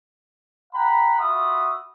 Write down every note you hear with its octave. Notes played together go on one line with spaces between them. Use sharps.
F#5 G5 A#5 B5
F4 F#4 E5 B5 D#6